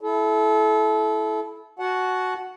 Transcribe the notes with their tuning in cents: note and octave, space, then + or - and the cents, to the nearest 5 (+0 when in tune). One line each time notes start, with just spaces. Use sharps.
E4 +0 A4 -30
F#4 +0 F#5 +0 A5 -30